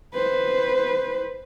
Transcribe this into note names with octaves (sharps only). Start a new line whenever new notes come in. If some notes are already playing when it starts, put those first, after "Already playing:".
B4 C5